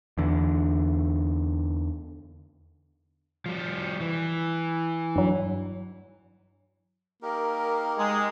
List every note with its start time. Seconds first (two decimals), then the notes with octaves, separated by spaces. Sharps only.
0.18 E2 D3
3.46 F3 G3
4.00 E3
5.16 G2 F#3
7.22 A#3 D#4 G4 A#4
7.98 G#3 G#4